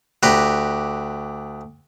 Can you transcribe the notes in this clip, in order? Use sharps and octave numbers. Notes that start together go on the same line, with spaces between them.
D2 G4 B4 A#5